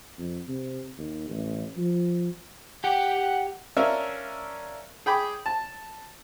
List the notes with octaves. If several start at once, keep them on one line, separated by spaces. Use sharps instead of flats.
F2
C3
D#2
A1
F3
G4 F#5 G5
C#4 D4 A#4 E5 F5
G#4 G5 B5 D6
A5